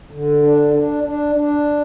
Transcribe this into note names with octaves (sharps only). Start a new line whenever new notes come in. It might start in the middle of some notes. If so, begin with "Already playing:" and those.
D3
D4
D4
D4
D4